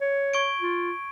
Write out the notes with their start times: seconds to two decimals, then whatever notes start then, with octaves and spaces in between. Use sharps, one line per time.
0.01 C#5
0.34 C#6 G#6 D7
0.61 F4